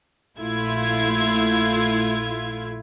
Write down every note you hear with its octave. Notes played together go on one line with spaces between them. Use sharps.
A#1 A3 E4 F4 G#6